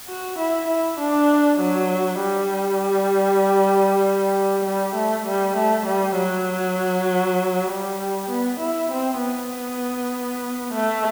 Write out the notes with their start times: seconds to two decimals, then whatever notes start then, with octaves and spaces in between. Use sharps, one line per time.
0.09 F#4
0.39 E4
0.69 E4
0.99 D4
1.60 F#3
2.21 G3
4.65 G3
4.96 A3
5.27 G3
5.57 A3
5.86 G3
6.17 F#3
7.70 G3
8.30 B3
8.61 E4
8.92 C4
9.21 B3
10.74 A3